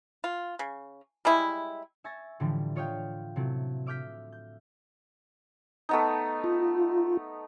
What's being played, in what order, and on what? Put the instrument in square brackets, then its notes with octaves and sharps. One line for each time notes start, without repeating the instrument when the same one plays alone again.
[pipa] F4
C#3
G3 G#3 E4
[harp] E5 G#5 C#6 A6 A#6
A2 D3 E3 F3 G3
F4 C#5 D#5 F5 G5
C3 F#3 A3 E4
E5 D6 F6 G6 B6
G6
[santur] A3 B3 D#4
[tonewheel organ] F4